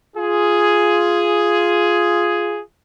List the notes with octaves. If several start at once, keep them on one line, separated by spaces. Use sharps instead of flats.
F4 G#4